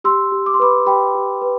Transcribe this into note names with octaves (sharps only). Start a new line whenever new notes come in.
G4 C6 E6
G4
D6
C6
B4 B5 D6
G4 G5 B5
G4
B4